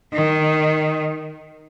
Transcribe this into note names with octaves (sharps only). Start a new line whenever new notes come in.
D#3